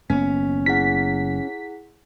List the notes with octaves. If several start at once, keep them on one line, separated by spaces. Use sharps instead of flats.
F#1 A#3 B3 C#4 B6
E4 G#4 F#5 B6